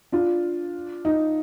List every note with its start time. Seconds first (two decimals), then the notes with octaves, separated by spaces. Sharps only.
0.12 D4 F4
1.05 D#4